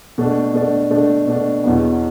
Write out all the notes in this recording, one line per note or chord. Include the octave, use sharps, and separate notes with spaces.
B2 A3 D4
B2 A3 D4
B2 A3 D4
B2 A3 D4
E2 B2 F#3 B3